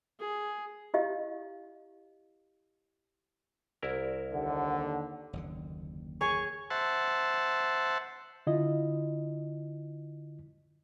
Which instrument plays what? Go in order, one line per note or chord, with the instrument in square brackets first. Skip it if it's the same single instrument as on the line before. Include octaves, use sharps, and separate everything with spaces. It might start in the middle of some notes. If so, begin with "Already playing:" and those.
[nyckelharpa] G#4
[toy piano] E4 G4 D#5 F5
[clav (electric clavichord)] C2 E4 A#4
[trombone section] D#2 D3 [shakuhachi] F#5
[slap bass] F#1 D#2 D3
[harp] G#4 C#5 G#5 [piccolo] C#6
[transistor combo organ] C5 E5 F#5 A5
[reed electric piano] D3 E4 F4 D#5